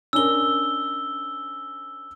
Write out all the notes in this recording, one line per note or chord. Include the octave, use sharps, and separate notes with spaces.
C#4 D4 A#4 E6 G7